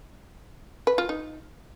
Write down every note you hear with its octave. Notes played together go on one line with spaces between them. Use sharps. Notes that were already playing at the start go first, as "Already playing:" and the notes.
B4
F4
D#4